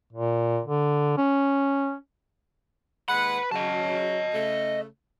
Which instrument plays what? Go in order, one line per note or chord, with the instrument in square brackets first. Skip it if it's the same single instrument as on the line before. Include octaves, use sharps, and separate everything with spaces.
[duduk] A#2
D3
C#4
[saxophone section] D#2 G#3 F#5 [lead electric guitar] B4 B5
[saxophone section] C#3 F#3 [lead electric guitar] D#5 A5
[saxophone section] C#3 A3